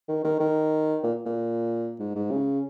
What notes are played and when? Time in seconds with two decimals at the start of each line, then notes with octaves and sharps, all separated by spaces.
0.08 D#3
0.24 D#3
0.40 D#3
1.03 A#2
1.26 A#2
1.99 G#2
2.15 G#2
2.31 C#3